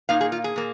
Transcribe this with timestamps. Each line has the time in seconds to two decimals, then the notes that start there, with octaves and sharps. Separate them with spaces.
0.09 A#2 A#3 D#4 F5
0.21 G#4
0.32 F4
0.44 G#4
0.56 A#2 A#3